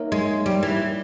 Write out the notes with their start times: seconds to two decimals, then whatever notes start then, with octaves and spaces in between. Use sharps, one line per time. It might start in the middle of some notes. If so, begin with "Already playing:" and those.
Already playing: A#3 D#4 A#4 C#5 E5
0.12 G#3
0.46 G3
0.63 E3